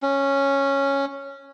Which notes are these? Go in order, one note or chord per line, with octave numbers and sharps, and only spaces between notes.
C#4